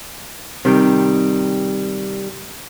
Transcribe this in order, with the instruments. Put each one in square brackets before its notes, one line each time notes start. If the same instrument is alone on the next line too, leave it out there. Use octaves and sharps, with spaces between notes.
[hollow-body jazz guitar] C3 D#3 G3